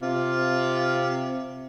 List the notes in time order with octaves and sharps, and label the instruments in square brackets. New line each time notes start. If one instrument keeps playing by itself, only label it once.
[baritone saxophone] C3 [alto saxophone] F4